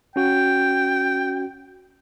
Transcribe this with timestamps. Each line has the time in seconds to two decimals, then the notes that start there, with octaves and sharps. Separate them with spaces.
0.16 C#4 F#4 G5